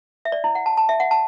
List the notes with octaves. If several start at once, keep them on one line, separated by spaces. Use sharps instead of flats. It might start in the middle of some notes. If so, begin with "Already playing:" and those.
E5
D5
E4
F#5
A5
A5
E5
F#5
A5